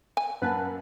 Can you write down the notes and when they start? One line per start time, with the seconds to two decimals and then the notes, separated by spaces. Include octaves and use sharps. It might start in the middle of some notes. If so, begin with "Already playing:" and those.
0.17 G#5
0.42 F#2 A#3 B4 F#5 A5